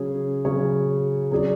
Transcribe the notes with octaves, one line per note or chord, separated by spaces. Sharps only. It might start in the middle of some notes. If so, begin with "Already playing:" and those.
Already playing: C#3 F#3 C#4 G#4 C#5
C#3 F#3 C#4 G#4 C#5
F#3 C#4 G#4 D5